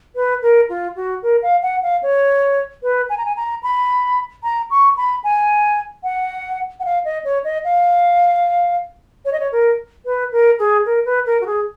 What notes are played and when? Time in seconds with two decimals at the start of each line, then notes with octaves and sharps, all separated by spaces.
0.15 B4
0.42 A#4
0.69 F4
0.95 F#4
1.22 A#4
1.42 F5
1.62 F#5
1.82 F5
2.02 C#5
2.83 B4
3.09 G#5
3.17 A#5
3.25 G#5
3.36 A#5
3.63 B5
4.43 A#5
4.70 C#6
4.97 B5
5.23 G#5
6.03 F#5
6.79 F#5
6.84 F5
7.04 D#5
7.24 C#5
7.44 D#5
7.64 F5
9.25 C#5
9.32 D#5
9.39 C#5
9.52 A#4
10.05 B4
10.32 A#4
10.58 G#4
10.85 A#4
11.05 B4
11.25 A#4
11.41 F#4
11.46 G#4